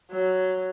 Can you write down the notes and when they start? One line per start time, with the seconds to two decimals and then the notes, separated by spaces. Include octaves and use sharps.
0.11 F#3